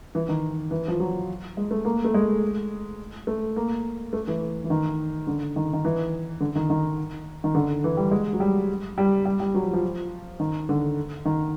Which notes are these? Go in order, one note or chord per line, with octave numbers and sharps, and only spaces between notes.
E3
D#3
E3
F3
F#3
G#3
A3
A#3
A3
G#3
A3
A#3
A3
E3
E3
D#3
D3
D#3
D#3
E3
D3
D#3
D#3
D#3
D3
E3
G3
G#3
F#3
G3
G3
G3
G3
F#3
F3
F3
D#3
D3
D#3